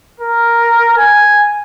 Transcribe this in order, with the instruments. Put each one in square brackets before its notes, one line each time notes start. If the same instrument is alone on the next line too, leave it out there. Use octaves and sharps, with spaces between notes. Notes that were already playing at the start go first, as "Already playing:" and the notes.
[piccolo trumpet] A#4
G#5